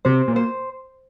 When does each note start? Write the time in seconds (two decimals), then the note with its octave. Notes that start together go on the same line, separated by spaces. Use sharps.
0.05 C3 C5
0.28 A#2
0.36 C5